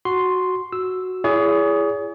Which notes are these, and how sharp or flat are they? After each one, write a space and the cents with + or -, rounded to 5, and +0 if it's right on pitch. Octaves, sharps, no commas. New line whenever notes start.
F#4 +0 C6 +0
F#4 +0 E6 +0
E4 +30 G#4 +0 C#5 +45